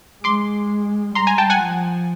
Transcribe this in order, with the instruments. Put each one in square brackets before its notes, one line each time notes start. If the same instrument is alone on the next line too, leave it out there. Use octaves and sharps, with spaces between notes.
[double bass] G#3 [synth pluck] C6 D6
[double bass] G3 [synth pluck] A#5 C6
[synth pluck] G#5 A#5
G5 A5
F#5 G#5
[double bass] F3